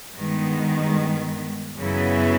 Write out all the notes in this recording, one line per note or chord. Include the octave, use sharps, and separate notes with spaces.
G2 D#3 G#3 B3
F#2 C#3 F#3 B3 E4